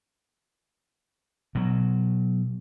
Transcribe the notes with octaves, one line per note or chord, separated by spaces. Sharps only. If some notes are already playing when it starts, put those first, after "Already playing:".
B2 F#3